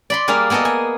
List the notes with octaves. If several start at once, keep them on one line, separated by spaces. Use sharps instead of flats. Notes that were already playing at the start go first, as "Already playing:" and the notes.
D5 B5 C6
G3 A#3 G#4 F5
A#3 B3 G#4 A4 D#5
G#5